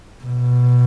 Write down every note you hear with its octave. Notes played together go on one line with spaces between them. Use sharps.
B2